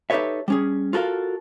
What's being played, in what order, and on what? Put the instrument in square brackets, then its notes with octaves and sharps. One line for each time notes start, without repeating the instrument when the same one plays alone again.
[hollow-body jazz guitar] D#4 G4 A4 B4 C#5 E5
G3 C#4 G#4
F4 F#4 A4 A#4 F5